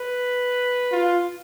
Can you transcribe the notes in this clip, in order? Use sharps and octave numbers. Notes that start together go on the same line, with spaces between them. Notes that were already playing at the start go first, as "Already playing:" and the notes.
Already playing: B4
F4